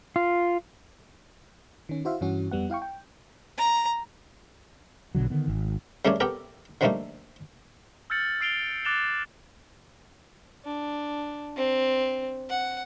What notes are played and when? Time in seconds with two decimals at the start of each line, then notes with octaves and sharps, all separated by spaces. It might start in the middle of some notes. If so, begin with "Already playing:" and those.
0.16 F4
1.89 D#3 C#4
2.05 E4 F#4 C5 E5 F5
2.21 G2 E3 C#4 F#4
2.51 F2 G3 B3 F#5
2.70 E4 F5 G5 C#6
2.82 G5
3.58 A#5
5.15 A#1 B2 D3 F#3
5.30 D3 D#3 B3
5.48 G#1
6.05 C#3 G3 A3 A#4 C#5 D5
6.20 B3 G4 A4 A#4 G5
6.81 D3 F3 G3 A3 A#3 D#4
8.10 E6 F6 G6 A6 C#7 F#7
8.41 E6 C7 D7 F7 G7
8.85 D6 F#6 A6 E7 F7 G7
10.65 D4
11.56 C4
12.49 F#5